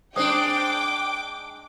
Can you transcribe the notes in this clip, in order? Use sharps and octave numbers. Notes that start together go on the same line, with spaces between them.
G#3 D4 C5 G5 D6 D#6